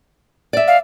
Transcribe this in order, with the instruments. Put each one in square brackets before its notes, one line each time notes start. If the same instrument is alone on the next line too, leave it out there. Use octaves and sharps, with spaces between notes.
[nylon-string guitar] D5 E5
[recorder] F5